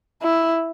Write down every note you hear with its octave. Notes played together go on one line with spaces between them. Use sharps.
E4